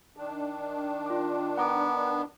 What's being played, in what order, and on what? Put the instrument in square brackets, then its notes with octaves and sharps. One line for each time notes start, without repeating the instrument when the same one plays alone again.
[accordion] D#3 D4
[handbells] F4 D6
[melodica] B3 [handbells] F#5 A#5 D6